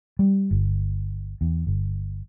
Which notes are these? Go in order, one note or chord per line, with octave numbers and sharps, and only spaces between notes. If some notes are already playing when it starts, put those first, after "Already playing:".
G3
G1
E2
G1